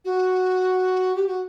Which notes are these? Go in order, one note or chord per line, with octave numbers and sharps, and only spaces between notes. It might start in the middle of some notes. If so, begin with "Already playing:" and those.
F#4
G4
F#4